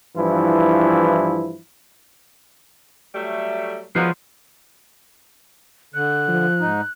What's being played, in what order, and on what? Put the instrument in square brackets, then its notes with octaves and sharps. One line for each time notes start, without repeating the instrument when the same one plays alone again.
[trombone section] G2 E3 F3 E4
[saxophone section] F#3 G3 A3
[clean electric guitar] F3 [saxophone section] F#3 G#3 B3
[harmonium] D3 [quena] F#6
[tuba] F3
[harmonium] G#2 D#4